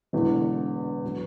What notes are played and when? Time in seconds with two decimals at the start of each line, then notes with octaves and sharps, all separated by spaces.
0.13 E1 E2 D3
1.04 B2 F#3 B3